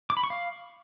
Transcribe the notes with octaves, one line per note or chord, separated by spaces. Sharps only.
D6
B5
C#6
F5